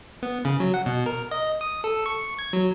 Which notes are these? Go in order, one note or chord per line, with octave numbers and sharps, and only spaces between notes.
B3
C#3
F#3
F#5
B2
A#4
D#5
D#6
A4
C#6
G#6
F#3